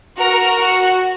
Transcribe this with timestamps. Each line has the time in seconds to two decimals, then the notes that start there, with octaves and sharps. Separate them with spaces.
0.19 F#4 A#4
0.60 F#4